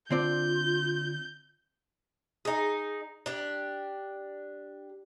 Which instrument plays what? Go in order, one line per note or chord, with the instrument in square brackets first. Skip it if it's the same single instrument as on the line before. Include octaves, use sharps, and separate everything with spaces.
[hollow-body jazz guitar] D3 C4 D5 [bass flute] F4 [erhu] G6
[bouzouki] D#4 G#4
D4 G4